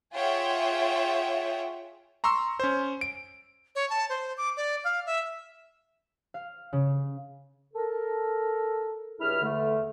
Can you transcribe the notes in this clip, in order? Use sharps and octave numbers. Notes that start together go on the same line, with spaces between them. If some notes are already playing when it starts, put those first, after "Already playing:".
F4 G#4 C#5 E5 F#5 G5
A#5 C6 C#6 E6
C#4 C5
D7
C#5
A5
C5
D6
D5
F5
E5
F5
C#3
A4 A#4
C#2 G2 E4 G#4 E5 F6
E2 D3 A3